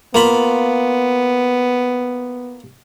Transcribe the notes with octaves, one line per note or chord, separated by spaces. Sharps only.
A#3 B3 F4 B5